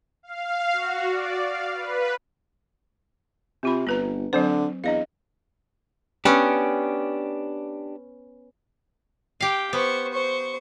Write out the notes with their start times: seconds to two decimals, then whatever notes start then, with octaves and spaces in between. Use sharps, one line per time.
0.23 F5
0.73 F#4
1.10 D5
1.43 F5
1.74 B4
3.63 C3 C4 F4 B5
3.87 G1 D4 B4 A#5
4.33 D3 F#3 C4 C5
4.84 E2 D4 D#5 F5
6.25 B3 C#4 D4 G4
9.40 G4 F5 G5
9.73 B3 C5 C#6
10.12 C5 C#6